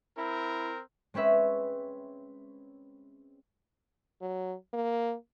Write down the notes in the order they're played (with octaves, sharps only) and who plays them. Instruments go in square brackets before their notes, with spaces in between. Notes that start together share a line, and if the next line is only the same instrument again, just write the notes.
[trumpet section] C4 A#4 [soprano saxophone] E4
[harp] G#3 C4 C#4 B4 E5
[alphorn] F#3
A#3